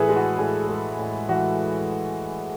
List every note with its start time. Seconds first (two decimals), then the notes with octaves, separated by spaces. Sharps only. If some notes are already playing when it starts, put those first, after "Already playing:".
Already playing: A2 E3 G#4 A4 B4
0.09 G#3
0.16 F#4
0.39 A2 G#4
0.69 G#3
0.99 A2
1.29 E3 F#4